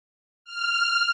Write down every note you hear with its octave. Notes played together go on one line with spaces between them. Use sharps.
F6